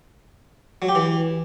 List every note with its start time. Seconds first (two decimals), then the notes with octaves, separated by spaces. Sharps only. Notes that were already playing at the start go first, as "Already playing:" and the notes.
0.82 F#3
0.89 G4
0.95 E3